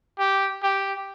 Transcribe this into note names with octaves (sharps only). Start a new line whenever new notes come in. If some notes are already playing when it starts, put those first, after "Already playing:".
G4
G4